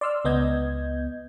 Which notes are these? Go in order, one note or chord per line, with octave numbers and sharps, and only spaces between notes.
D5 C6 E6 F6
C#2 B3 D#5 G6 G#6